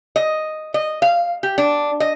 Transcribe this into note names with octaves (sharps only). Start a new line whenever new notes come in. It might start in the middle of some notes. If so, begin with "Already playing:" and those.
D#5
D#5
F5
G4
D4
D#5